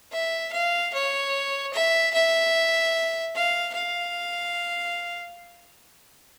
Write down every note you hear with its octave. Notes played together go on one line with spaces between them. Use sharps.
E5
F5
C#5
E5
E5
F5
F5